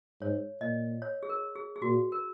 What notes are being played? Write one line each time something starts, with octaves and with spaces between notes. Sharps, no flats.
G#2 C#5
A#2 D#5
C#5
G#4
A#4
G#4
G#4
A#2 F#4
A#4